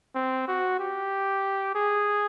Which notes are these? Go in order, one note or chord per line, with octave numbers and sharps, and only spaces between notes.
C4
F#4
G4
G#4